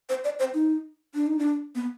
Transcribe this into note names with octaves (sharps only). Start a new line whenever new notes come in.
C5
D5
C5
D#4
D4
D#4
D4
B3